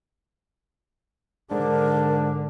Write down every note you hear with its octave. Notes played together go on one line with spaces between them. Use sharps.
G#2 D3 D4 A#4